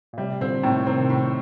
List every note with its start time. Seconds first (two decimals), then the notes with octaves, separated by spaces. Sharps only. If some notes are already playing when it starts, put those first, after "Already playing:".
0.13 A#2
0.18 A2 C3 G3
0.41 A#2 D3 C4
0.63 A2 C3 D#3
0.86 C3 D#3 C4
1.10 A2